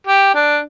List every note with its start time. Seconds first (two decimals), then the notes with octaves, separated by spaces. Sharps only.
0.07 G4
0.34 D4